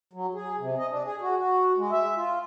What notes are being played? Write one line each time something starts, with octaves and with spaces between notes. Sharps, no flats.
F#3
G#4
C3
D#5
D4
G#4
F#4
F#4
G#3
E5
F4